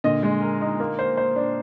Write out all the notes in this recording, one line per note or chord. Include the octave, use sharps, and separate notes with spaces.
A#2 D3 D#5
G#3
A#4
D#4
A#3
C5
C5
D4